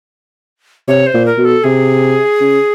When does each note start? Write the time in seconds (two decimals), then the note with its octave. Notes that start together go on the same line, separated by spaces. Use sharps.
0.88 C3 C#5
1.07 C5
1.13 A#2
1.26 A#4
1.38 B2
1.45 A4
1.64 C3 G#4
2.41 C#3